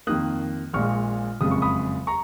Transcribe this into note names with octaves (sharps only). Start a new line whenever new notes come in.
F2 D#3 A#3 D#6 F#6
A#1 A#2 G#3 C#6 F6
F#1 F2 C#3 G#3 D#6
C#6
B5 D#6
A#5 C#6